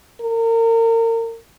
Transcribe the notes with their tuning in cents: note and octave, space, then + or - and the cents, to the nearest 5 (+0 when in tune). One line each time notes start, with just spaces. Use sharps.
A#4 -35